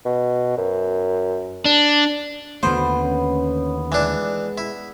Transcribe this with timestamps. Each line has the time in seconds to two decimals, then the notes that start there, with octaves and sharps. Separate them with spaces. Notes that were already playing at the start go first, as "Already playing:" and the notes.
0.06 B2
0.58 F#2
1.65 D4
2.63 D#2 D3 A3 B3 F#4 C5
2.96 C#4
3.92 E3 G#3 D4
4.58 E4